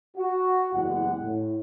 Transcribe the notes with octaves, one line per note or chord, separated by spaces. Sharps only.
F#4
F#1 E2 G3 G#3 F#5
A2